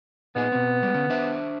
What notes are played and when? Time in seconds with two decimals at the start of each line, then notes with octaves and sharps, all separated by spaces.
0.36 A#2 B3 D#4 G#4
0.52 B2 C4
0.83 G3 G#3
0.94 D3 C#4
1.10 D4 C5 E5